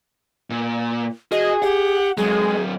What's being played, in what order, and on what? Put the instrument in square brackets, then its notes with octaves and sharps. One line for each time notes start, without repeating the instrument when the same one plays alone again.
[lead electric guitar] A#2
[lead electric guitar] F#4 [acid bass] G#4 [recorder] D#5
[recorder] G4 [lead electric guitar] F#5
[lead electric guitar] F#3 C4 [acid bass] G#3 [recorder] G#4